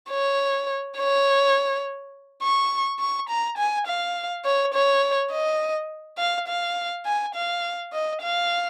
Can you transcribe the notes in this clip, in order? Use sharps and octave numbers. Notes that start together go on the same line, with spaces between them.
C#5
C#5
C#6
C#6
A#5
G#5
F5
C#5
C#5
D#5
F5
F5
G#5
F5
D#5
F5